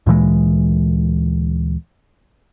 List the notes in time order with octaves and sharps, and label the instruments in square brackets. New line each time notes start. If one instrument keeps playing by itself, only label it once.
[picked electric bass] D2 A#2 E3 G#3